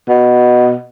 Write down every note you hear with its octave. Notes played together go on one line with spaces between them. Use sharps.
B2